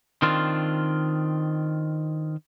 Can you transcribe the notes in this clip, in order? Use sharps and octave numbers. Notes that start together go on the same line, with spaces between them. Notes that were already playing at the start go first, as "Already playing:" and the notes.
D#3 C4 D4 F4